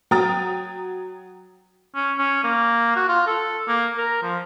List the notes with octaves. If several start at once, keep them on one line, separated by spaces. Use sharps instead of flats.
F#3 G5 A#5 D#6 A6
C#4
C#4
A#3
F#4
F4
A4
A#3
A#4
F3